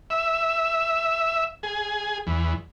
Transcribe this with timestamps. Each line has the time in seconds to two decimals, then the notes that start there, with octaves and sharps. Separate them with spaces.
0.10 E5
1.63 G#4
2.27 E2